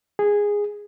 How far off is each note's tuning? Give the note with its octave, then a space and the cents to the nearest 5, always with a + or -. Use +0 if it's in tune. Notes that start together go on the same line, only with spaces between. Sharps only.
G#4 -10